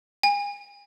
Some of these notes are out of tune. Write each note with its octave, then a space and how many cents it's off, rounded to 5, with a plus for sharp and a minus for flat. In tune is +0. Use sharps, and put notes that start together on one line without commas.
G#5 -30